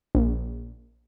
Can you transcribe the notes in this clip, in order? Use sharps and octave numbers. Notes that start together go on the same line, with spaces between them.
A#1